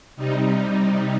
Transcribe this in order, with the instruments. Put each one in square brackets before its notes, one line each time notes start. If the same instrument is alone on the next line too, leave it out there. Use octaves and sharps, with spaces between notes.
[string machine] C3 G3 D#4